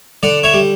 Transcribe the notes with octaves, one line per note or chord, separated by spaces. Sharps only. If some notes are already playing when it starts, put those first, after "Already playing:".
D3 D5 F#5
C#5 E5
G3